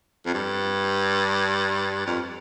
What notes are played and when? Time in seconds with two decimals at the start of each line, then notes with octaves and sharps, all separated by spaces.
0.26 F2
0.34 G2
2.06 F2